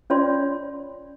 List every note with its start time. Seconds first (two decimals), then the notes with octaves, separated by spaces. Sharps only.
0.10 C#4 F4 C#5 D5 C6